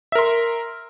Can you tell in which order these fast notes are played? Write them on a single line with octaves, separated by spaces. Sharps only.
E5 A#4 C6